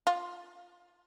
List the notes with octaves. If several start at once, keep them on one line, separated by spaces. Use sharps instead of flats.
F4